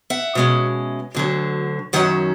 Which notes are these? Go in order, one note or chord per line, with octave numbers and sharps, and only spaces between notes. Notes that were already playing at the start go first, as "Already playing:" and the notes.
E5 F#5
B2 G#3 C#4
D2 D3 F#3
F#2 D#3 F#3 C#4 F#5